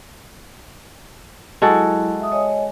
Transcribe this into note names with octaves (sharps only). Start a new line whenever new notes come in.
F#3 G#3 E4 F#4 A4
E5 D#6
C#5 D#5 G#5